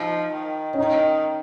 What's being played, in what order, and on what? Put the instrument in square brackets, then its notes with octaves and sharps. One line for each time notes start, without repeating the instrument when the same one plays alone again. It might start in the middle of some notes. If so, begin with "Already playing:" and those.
Already playing: [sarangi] F3 [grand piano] D#4
[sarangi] D#3
[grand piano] C#4
[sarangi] D#3 [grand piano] D#4